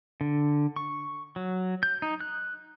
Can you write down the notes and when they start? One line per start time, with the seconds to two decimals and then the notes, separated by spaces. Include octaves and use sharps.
0.21 D3
0.76 C#6
1.36 F#3
1.83 G6
2.02 D#4
2.21 F#6